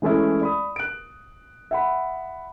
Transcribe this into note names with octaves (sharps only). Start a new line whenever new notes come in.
E3 G#3 A3 C#4 E4
D5 B5 D#6
F#6 D7
E5 F#5 B5